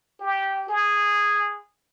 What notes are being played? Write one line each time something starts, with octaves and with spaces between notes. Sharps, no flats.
G4
G#4